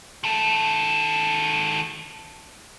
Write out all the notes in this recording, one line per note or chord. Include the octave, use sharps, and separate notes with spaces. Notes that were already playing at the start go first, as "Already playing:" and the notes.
D#3 A4